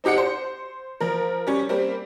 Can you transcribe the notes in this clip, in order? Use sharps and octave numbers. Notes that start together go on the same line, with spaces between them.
C4 D#4 G4 F#5 C#7
C5
F3 A#4
G3 C#4
G3 A#3 C4